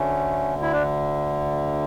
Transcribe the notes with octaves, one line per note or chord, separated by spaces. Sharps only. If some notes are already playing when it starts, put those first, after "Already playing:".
Already playing: D2 D3 A3 C#4
E4
D4